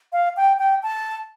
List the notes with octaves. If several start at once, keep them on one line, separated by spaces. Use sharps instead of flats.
F5
G5
G5
A5